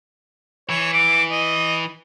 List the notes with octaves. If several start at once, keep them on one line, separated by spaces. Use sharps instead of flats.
E3 C#5
D6
D#5